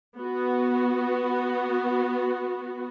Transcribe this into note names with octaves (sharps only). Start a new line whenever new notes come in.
B3 F#4